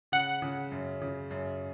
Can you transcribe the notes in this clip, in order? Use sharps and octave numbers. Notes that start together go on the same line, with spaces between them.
C#3 F#5
C#3
F#2
C#3
F#2